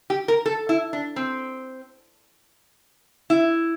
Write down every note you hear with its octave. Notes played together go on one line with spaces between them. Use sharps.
G4
A#4
A4
E4
D4
C4
E4